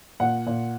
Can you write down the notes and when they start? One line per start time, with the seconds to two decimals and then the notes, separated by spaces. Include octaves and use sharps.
0.20 A#2 F#5
0.47 A#2